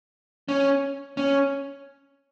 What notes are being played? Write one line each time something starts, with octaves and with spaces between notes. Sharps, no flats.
C#4
C#4